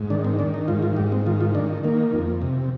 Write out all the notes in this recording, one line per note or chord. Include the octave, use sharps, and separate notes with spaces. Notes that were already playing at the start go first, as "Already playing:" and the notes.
Already playing: G#2
D#3 D4
C4
D#3 D4
D#4
G#2 F4
F4
G#2 G4
C4
D#3 F4
F4
D#3 D4
D#3 A#3
F2
C3